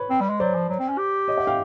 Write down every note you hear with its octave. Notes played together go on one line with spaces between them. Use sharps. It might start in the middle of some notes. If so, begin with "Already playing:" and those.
Already playing: B4 C#5
C4
G3
G#3
F#3 C5 D5
F3
F#3
C4
C#4
G4
C#5 D#5
E5 F#5
F5 G5